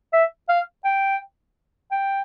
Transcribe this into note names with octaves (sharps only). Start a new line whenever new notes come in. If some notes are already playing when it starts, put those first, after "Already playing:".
E5
F5
G5
G5